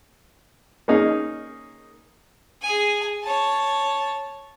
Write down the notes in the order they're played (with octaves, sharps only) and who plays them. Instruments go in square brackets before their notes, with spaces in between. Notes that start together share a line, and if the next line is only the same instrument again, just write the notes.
[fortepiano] A#3 C#4 D#4 G#4 A#4
[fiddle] G#4 G#5
C#5 A5